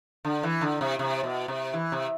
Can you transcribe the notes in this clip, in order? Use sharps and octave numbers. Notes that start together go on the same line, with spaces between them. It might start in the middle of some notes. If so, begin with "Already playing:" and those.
D3
E3
D3
C3
C3
B2
C3
E3
C3